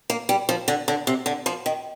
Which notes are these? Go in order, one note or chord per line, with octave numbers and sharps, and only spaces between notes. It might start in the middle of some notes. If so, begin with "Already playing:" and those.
A#3
G3
F3
D3
D3
C3
D3
F3
D#3